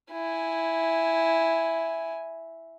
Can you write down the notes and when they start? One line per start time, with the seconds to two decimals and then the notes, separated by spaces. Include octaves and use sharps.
0.11 E4 G#5